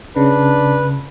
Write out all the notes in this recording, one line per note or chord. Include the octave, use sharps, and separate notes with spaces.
C#3 D4 B4